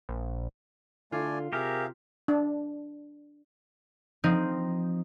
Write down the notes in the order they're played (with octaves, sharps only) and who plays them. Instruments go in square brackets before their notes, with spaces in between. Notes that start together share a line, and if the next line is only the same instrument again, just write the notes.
[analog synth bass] A#1
[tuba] D3 [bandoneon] A3 D5 G#5 [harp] F4
[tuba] C3 [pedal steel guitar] G4 A#4 [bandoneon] G#4 E5 F5
[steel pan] D4
[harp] F3 C4 D#4